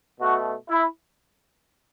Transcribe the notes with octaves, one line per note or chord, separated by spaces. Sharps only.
B2 A3 F#4
E4